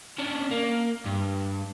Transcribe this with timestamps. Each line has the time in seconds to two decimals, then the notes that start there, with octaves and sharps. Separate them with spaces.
0.18 C#4 D4
0.51 A#3
1.06 G2